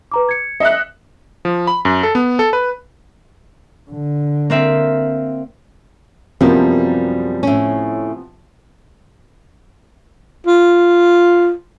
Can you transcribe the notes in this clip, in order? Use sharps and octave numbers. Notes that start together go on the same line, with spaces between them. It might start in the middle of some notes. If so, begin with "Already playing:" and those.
B4 A#5 D6
G#6 C#7
D#5 E5 F#6 C#7
F3
B5
F#2
A4
B3
A4
B4
D3
A#3 C4 E5
F#2 C3 F3 G3 A#3 B3
A2 C#4
F4